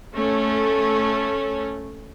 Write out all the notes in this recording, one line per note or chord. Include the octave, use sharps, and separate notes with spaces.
A3 C#4